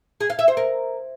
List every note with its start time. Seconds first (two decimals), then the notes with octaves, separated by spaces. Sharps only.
0.21 G#4
0.30 F5
0.39 E5
0.48 C5
0.57 A#4